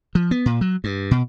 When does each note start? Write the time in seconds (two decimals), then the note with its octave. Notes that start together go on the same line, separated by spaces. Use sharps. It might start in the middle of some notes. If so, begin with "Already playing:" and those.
0.15 F3
0.31 B3
0.46 A#2
0.61 F#3
0.84 G2
1.11 B2